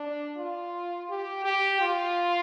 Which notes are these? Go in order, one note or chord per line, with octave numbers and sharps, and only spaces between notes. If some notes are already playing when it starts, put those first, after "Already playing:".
Already playing: D4
F4
G4
G4
F4